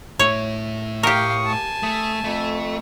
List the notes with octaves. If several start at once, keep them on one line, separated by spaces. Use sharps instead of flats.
A2 E4 C#5
G4 A#4 F5 G5 C#6 D#6
G#5 A5
A3 D#6
F2 A3